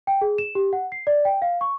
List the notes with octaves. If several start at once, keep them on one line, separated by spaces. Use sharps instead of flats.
G5
G#4
E7
G4
F#5
C7
D5
G5
F5
C#6